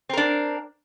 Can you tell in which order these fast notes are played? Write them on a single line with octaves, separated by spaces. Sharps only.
C4 A#4 D4